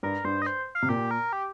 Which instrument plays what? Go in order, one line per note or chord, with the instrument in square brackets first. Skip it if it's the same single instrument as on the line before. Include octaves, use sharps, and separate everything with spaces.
[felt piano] G2 [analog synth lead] A#4
[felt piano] G2 [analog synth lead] C5
[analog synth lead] D#5
C5
F5
[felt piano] C3
[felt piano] A#2 [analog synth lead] G4
[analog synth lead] A#4
G4